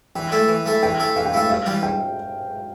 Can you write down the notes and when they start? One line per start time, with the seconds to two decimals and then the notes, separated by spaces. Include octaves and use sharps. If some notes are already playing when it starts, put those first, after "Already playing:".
0.15 E3 G5
0.32 A3 E4 A4
0.48 E3
0.66 A3 E4 A4
0.82 E3 G5
1.00 A3 E4 A4
1.16 E3 F5
1.25 G5
1.33 A3 E4 A4 F5
1.49 G2 F5
1.66 E3 G3 D4
1.83 G5